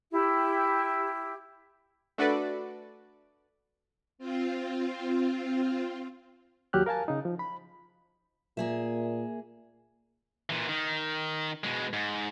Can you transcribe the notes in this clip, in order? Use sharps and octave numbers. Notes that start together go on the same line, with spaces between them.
E4 G4
A3 D4 F#4 A4 B4 D5
C4 F4
D#2 F#3 G4 F6 F#6
A#4 F5 G#5 A5
C#3 D#4
F3
B5
A#2 A#3 G#4 E5
A#2 E3
D#3
B2 G#3
G#2